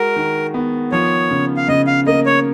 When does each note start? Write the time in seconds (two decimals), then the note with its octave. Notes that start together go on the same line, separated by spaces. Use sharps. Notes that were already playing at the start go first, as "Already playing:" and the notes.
Already playing: G#3 F#4 A#4
0.16 D#3
0.54 B3
0.92 F3 C#5
1.31 C#3
1.57 F5
1.68 C#3 D#5
1.87 F5
2.07 A#3 D#5
2.26 C#5